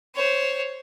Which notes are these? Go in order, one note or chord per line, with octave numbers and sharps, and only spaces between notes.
C5 C#5